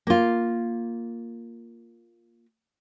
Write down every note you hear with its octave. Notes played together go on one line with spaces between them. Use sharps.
A#3 F4